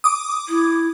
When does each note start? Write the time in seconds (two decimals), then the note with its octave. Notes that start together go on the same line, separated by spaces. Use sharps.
0.04 D6 D#6
0.49 E4